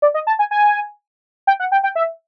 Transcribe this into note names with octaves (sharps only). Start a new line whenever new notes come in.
D5
D#5
A5
G#5
G#5
G5
F#5
G5
G5
E5